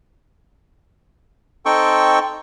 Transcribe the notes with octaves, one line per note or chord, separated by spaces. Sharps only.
C4 D#4 A4 G5 C#6